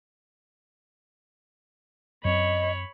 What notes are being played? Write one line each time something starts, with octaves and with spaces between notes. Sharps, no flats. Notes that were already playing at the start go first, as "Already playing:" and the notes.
F#2 C4 C#5 D#5 B5